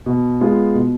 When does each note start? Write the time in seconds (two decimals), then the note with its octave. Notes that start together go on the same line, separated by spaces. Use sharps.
0.06 B2
0.41 G#3 B3 F4
0.75 B2